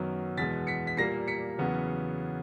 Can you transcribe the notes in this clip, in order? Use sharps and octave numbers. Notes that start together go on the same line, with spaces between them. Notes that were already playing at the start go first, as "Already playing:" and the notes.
Already playing: F#2 D#3 F#3 B3
E2 B2 G#3 B3 A6 B6
B6 C#7
B6
A#2 G3 A#3 A#6 C7
B6 C#7
E2 C#3 F#3 B3